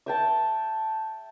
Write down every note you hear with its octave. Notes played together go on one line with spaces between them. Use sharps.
E5 G5 A5